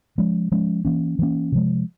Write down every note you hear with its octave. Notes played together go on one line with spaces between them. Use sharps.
F3 G#3 C#4
F3 G#3 C#4
E3 A#3 C#4
E3 A#3 C#4
C3 F3 G#3